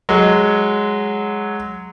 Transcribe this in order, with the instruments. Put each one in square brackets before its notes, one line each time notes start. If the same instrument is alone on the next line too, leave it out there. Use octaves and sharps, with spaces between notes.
[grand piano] F#3 G#3